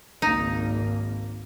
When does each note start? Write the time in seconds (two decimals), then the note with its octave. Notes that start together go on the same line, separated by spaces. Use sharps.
0.22 G#1 C#2 A#3 D#4